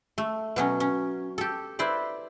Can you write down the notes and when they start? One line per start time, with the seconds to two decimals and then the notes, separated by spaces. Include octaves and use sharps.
0.18 A3
0.56 B2 F#3 C#4
0.80 C#4
1.38 G4 A4
1.79 E4 B4 C5 D5